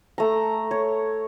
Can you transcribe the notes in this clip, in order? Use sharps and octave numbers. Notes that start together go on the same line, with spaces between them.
A3 A#5
C#5